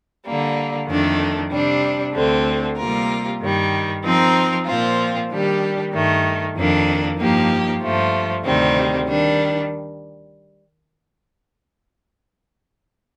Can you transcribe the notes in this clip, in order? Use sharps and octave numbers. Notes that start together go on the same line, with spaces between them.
D3 G3 A#3
F2 D#3 A3 D4
C3 G3 D4
D2 D3 A3 C4
C3 G3 A#3 F4 A#4
G2 D#3 G3
F3 C4 D#4 A#4
A#2 F3 C4 F4
D#3 G3 D4 G4
G2 D#3 A3
F2 D#3 A#3 D4
G2 F3 A#3 D#4 G4
G2 F3 A3
D2 C3 D#3 G3 C4
D#3 G3 D4